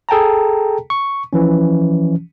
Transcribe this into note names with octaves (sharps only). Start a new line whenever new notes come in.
G#4 A4 G5 A5 A#5
C#6
E3 F3 C#4